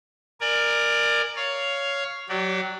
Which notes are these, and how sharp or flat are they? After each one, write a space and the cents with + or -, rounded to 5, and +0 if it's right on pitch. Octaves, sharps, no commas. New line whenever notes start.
A#4 +0 D5 +20 G#5 +0
C#5 +10 F5 +0
F#3 +0 G4 -40 D5 +0